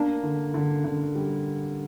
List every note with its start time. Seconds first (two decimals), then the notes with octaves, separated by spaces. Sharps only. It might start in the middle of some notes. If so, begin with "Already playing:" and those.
Already playing: A#3 D4
0.23 D3
0.54 D3
0.84 D3
1.15 G3